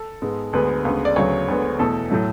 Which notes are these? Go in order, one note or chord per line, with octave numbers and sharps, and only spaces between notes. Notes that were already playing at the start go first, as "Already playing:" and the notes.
Already playing: A4
G#2 G#3 B3
D2 D3 G#3 B3 B4
D2 C#3 G#3 B3
D5
D2 C#3 F#3 B3 C#5
D2 D3 G#3 B3
E2 B2 A3 A4
A2 F#3 A3